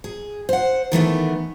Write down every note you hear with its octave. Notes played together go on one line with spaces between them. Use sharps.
G#4
C5 F#5
D#3 E3 A3 B3